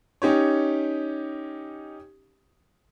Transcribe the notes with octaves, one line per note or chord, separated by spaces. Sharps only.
C#4 D#4 G4 C#5